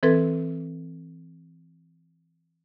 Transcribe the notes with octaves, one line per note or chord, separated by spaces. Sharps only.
E3 C4 A4 B4 G#6